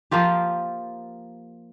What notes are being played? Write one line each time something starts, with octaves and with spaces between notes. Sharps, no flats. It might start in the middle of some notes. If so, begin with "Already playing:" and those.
F3 A#3 F4 G4